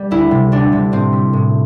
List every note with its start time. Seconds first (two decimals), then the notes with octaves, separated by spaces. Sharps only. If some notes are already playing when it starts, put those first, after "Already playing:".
Already playing: G3
0.11 D2 E4
0.31 C3 G3
0.52 D2 D4
0.72 C3 G3
0.92 A2 C4
1.13 G3
1.33 A2